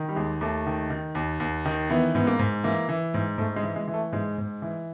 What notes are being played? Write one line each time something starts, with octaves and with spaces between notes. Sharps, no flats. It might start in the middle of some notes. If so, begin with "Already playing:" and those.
Already playing: D#3
G3
D#2 G#3
D#2 A3
D#3
D#3
D#2
D#2
D#3
E3 B3
G#2 B3
A#3
G#2
E3 A#3
E3
G#2
G#2 A3
G#3
E3
G#3
E3
A3
G#2 G#3
G#2
E3